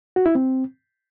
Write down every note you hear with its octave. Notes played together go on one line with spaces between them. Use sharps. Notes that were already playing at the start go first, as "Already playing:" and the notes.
F#4
E4
C4